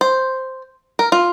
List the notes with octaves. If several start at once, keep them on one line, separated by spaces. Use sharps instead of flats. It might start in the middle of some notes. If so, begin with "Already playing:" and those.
C5
A#4
F4